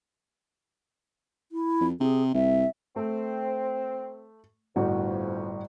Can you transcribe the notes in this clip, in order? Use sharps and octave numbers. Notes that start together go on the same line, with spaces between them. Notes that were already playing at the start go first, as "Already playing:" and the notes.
E4
F2
C3 G#4
C2 E5
A3 C4
G1 F2 A2 F#4